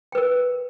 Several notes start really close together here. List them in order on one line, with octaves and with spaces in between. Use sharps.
G5 B4 A#4